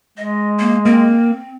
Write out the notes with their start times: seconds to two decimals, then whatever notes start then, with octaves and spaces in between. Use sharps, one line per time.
0.17 G#3 D#5
0.59 A#3
0.85 A#3 C4